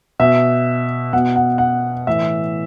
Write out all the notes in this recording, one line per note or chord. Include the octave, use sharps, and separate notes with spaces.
B2 E5
B2 F#5
F#5
F#5
A2 E3 E5